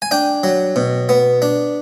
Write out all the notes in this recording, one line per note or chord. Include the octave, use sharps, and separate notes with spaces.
G#5
D4 G5
F#3
B2
B3
D4